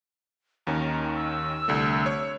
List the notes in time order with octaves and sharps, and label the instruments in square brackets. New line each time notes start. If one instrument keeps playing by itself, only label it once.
[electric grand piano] D#2 D#3 C#4 [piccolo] A#5
[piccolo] E6
[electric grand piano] C2 D3 A3
C#5